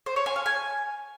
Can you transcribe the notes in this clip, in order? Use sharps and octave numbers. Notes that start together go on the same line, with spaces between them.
C5
C#5
G#5
F5
G#5